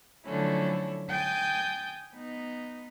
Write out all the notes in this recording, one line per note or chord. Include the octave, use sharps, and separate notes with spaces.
D3 F3 F#3 A3 C#4 E4
G5 G#5 D#6 G6 A6
B3 D#4